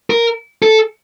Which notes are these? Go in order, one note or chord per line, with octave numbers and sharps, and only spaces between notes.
A#4
A4